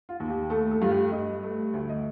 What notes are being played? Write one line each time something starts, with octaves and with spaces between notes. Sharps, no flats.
F4
D#2
G4
A3 A4
A4
G2 F4
G4
G2 D#5
A3
D2
D#5